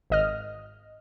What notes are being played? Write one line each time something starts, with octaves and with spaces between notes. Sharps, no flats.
G#1 D#5 F6